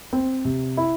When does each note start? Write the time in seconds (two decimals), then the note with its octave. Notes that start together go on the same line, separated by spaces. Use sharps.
0.13 C4
0.45 C3
0.77 E4